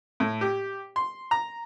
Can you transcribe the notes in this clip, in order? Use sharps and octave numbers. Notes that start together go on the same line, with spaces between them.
A2
G4
C6
A#5